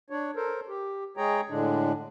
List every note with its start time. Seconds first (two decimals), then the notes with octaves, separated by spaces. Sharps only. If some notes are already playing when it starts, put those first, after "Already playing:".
0.10 D4 C#5
0.36 A4 A#4 C5
0.68 G4
1.17 G#3 G#4 C#5 G5 A#5
1.50 A2 D3 G#3 D4